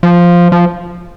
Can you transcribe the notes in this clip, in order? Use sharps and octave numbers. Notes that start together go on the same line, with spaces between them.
F3
F3